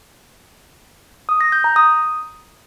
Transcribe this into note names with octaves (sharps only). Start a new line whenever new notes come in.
D#6
A#6
G6
A#5
D#6